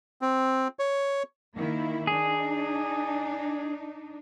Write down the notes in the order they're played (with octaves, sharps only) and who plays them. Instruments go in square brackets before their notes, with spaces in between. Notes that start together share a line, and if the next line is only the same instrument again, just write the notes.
[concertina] C4
C#5
[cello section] D#3 A#3 E4
[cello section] D4 D#4 [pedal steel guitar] G#4